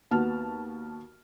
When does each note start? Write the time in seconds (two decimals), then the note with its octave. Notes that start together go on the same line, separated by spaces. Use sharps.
0.11 D#2 B3 F#4 A5 F6